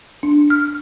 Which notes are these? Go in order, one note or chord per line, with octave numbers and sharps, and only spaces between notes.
D4
F6